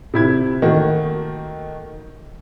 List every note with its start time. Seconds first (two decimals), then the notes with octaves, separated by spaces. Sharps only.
0.14 C3 E4 G#6
0.62 D#3 A3 A#3 F#4